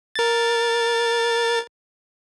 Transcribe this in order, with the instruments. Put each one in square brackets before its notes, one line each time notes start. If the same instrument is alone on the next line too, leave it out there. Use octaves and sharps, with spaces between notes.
[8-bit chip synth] A#4 A6